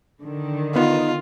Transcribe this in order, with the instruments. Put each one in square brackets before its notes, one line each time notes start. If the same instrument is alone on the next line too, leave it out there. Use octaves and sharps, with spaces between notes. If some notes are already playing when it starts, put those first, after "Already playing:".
[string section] D3 D#3
[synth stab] B3 [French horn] D#4 [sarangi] F4